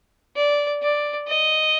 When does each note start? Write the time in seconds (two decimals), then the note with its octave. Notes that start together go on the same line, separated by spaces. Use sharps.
0.36 D5
0.82 D5
1.28 D#5